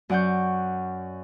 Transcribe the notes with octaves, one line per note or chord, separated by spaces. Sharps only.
F#2 D5 F#5 C#6 G6